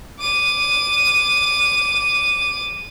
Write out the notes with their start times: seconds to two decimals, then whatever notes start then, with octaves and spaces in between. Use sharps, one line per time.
0.19 D6 D#7